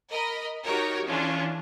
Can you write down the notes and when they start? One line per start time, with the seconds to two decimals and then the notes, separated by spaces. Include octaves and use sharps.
0.11 A#4 D#5 B5
0.63 D#4 F#4 G4 A#4 C#5
1.07 E3 C#4 D4 F4 G#4